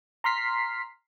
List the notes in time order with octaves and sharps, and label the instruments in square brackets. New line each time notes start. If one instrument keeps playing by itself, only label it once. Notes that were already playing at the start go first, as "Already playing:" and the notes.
[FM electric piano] A#5 C6 F6 B6 C7